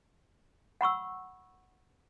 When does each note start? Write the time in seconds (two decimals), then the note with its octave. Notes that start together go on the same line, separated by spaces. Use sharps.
0.81 F#5 B5 C#6 E6